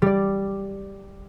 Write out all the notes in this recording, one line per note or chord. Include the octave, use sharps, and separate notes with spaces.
G3 D5